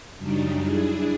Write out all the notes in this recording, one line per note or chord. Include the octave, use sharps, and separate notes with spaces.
F#2 C#3 F#3 G3 D4 D#4
D4 E4 G#4